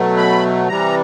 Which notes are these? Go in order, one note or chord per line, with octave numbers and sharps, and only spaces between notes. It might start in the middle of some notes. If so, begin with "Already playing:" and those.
Already playing: B2 F#3 A3
B5
C3 E3 G3 A#5